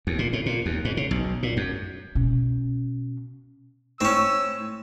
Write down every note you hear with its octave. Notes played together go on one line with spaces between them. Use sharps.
D#2
A#2
A2
A#2
D#2
G#2
C#3
B1
A#2
F#2
B2 C#4
A2 C4 C#4 C#6 E6 E7